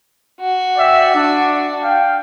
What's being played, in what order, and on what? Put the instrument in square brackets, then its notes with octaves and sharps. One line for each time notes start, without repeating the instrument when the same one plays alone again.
[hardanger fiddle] F#4
[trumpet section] D5 E5 G5
D4
F5 G5